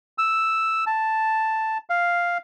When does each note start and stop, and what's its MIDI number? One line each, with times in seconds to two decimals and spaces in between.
0.18 0.85 88
0.87 1.78 81
1.90 2.38 77